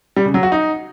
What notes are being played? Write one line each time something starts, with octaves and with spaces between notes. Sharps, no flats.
G3
C#3
F#3
F#4
D#4